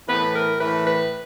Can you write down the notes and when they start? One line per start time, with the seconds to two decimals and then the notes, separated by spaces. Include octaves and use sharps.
0.08 A2 E3 B4
0.34 A#4
0.59 A2 E3 B4
0.85 B4